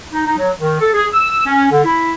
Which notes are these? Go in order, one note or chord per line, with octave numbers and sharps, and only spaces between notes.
D#4
D#4
F#3
D#3
A4
G#4
E6
C#4
D3
E4